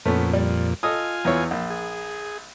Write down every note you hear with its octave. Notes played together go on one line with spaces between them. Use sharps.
F2 A#2 A3 B3 C#4
G3
F4 A4 D#5 G#5 D#6
E2 E3 C#5
A#1
G#4